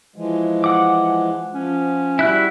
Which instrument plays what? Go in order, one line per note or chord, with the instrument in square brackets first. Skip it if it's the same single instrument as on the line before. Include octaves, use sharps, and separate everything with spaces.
[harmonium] E3 F3 G#3
[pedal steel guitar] F#5 D6
[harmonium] F3 [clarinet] C#4
[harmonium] G3 F#4 [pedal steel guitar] E4 F#6 [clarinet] E5